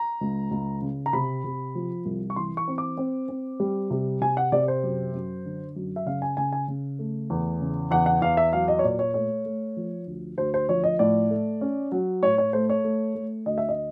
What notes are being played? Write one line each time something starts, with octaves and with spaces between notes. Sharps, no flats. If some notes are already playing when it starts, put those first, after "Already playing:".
Already playing: A#5
C#2
C#2
C#3
A#5
C3 B5
C3
F3
C2
C#6
E3 C6
C#6
C4
D6
C4
C4
G3
C3
C3 G#5
F#5
C3 D5
C5
F#2
F#2
D3
F#2
E5
C#3 F5
G#5
C#3 G#5
G#5
C#3
A3
E2
C#3
E2 F#5
F#5
E2 F5
E5
F#3 F5
D#5
C#5
A#2 D5
C#5
A3 C#5
A3
F3
D2
D2 C5
C5
F3 C#5
D#5
A2 D5
A3
C#4
F#3
A2 C#5
C#5
A3 C5
C#5
A3
A3
D2 D#5
E5
D#5